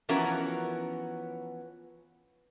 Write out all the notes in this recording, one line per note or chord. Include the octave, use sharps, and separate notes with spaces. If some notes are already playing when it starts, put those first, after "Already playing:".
E3 F3 B3 C#4 F#4 A#4